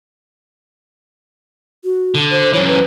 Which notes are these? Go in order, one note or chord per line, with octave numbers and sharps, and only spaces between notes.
F#4
D3
C5
F#2 E3 C#5
B4